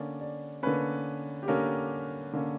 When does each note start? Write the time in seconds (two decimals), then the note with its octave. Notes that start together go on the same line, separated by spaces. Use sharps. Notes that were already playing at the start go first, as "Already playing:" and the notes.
Already playing: D3 A#3 C#4 D5
0.21 D5
0.63 D3 A#3 C#4 B4
1.43 G4
1.48 D3 A#3 C#4 A#4
2.33 D3 A#3 C#4